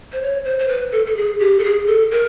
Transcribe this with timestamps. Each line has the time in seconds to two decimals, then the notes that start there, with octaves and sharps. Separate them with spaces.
0.12 C5
0.22 C#5
0.45 C5
0.59 C5
0.68 B4
0.92 A4
1.06 A4
1.16 G#4
1.40 G4
1.59 A4
1.64 G#4
1.87 A4
2.11 A#4